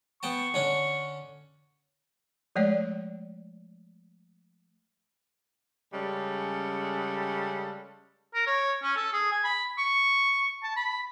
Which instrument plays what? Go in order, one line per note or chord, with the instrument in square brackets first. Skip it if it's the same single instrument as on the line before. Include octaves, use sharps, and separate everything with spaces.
[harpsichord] B3 G5 A5 [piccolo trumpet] C#6
[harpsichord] D3 C#4 D4
[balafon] F3 G#3 A3 C#5 D5
[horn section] C#3 G3 G#3 C#4 A4
[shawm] A#4
C#5
C#4
A4
G#4
G#5
B5
C#6
A5
B5